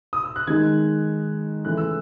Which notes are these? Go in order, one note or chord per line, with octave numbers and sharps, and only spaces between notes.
D#6
E6
F#6
D#3 G#3 D#4 G#6
C#3 E3 A3 E4 F#6
E6